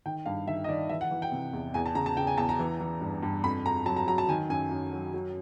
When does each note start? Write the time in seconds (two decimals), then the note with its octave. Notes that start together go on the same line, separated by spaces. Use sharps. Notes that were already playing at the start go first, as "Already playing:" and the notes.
0.06 D#3 G5
0.26 G2 F5
0.48 D#3 E5
0.64 D#5
0.68 D#3 D5
0.89 E3 E5
1.01 F#5
1.11 E3
1.22 G5
1.32 C3
1.53 E2
1.74 E2 G#5
1.86 A5
1.95 C#3 A#5
2.06 A5
2.17 C#3 G5
2.27 G#5
2.38 E2 A5
2.49 A#5
2.59 E3
2.80 E3
3.01 G2
3.23 G2
3.44 F2 B5
3.65 F2 A#5
3.86 F#3 A5
3.97 A#5
4.07 F#3 A#5
4.18 A5
4.29 D#3 G#5
4.50 F#2 G#5
4.71 F#2
4.93 F#3
5.14 F#3